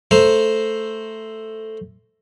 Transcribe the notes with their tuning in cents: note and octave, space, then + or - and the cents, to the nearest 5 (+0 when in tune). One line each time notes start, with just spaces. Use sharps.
A3 +0 C5 +0 A#5 +0